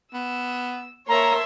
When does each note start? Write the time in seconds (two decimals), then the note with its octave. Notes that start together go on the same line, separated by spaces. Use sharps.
0.14 B3 E6
1.08 A#3 A#4 C#5 E5 A5 A#5 C6